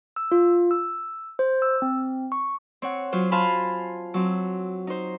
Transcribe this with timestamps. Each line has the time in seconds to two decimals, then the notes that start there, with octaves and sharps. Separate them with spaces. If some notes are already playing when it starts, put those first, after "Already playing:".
0.16 E6
0.32 F4
0.71 E6
1.39 C5
1.62 E6
1.82 C4
2.32 C#6
2.82 C4 C#5 F#5
3.12 F#3 F4 C5
3.31 F4 C5 F5 G#5 A5 B5
4.14 F#3 C4
4.87 D#4 C5